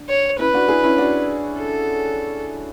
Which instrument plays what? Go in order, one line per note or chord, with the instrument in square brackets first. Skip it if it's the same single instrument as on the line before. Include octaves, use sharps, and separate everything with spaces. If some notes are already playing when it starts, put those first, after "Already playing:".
Already playing: [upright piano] D4
[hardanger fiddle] C#5
[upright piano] C#4 E4 [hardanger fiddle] B4
[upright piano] D4 F#4
E4 G#4
C#4 E4
D4 F#4
[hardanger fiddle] A4